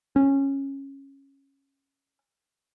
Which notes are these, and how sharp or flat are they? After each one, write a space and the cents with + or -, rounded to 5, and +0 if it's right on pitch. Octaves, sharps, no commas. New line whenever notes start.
C#4 -15